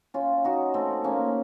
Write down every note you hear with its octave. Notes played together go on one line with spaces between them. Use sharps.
C#4 F4
D#4 F#4
A3 C4
A#3 C#4